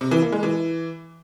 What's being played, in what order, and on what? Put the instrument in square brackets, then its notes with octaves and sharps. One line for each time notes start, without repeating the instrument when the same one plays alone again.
[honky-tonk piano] C3
E3
A#3
G#3
E3